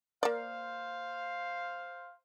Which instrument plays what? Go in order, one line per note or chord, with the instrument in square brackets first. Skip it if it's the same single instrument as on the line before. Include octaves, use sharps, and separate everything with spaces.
[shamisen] A#3 D5 [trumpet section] C5 F5